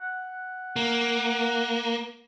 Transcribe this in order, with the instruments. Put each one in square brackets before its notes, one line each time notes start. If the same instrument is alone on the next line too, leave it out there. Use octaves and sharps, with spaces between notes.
[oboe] F#5
[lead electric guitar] A#3